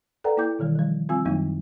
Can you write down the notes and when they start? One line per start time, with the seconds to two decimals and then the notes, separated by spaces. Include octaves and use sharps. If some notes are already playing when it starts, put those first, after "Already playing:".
0.24 A4 B4 D5 F#5 G5 A#5
0.37 A#3 E4 G5 D6 G6
0.59 B2 D#3 E3 G3
0.75 F3 G3
1.09 G3 C4 F4 G#5 E6
1.25 F#2 D#3 F#3 G3 A#3 D#4